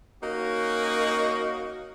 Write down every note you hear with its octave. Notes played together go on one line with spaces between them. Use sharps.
A#3 C#4 D#4 F#4